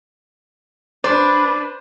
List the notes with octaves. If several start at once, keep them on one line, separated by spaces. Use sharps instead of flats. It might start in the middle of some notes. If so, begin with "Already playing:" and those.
D4 B4 C5 D5